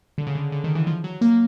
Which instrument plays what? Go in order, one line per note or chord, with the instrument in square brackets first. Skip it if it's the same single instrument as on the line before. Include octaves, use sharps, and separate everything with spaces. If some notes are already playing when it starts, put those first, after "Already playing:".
[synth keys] D3
C#3
D3
D3
D#3
E3
F3
F#3
A#3